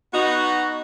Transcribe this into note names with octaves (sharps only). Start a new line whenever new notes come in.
B3 D#4 F#4